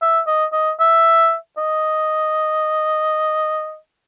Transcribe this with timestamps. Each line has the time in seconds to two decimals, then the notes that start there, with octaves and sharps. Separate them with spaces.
0.02 E5
0.27 D#5
0.53 D#5
0.80 E5
1.58 D#5